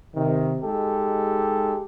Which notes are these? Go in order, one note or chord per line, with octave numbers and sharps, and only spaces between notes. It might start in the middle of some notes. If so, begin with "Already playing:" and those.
C3 D#3
G#3 D#4 G4 A4